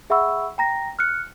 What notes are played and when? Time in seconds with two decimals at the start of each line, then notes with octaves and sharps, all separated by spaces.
0.10 G#4 E5 F#5 B5 C#6 E6
0.58 G5 A#5 A#6
0.99 F6 F#6 C#7